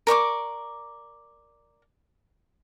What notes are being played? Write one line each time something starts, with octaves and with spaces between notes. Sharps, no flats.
A#4 D5 C#6 D6